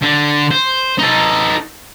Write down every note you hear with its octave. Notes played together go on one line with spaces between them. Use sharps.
D3
C5
D#4 A4